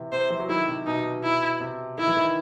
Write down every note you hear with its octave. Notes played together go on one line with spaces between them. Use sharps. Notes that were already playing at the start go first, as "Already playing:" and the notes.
Already playing: C3 E3
C3 C5
E3
F#3
D#3 E4
C3
B2 D#4
E4
C3
D#3 E4
E3
D#3